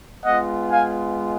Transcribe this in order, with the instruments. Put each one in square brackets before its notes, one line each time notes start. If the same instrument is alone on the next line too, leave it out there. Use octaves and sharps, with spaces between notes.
[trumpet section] G#3 B3 F4 D#5 F#5
F5 G#5